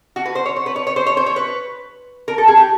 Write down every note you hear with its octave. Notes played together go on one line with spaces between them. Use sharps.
F#4
B4
C5
C#5
C5
B4
C#5
C#5
C5
C#5
C5
C#5
B4
A#4
A4
G#4
G4